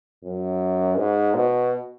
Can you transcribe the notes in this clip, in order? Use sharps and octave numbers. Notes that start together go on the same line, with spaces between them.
F#2
G#2
B2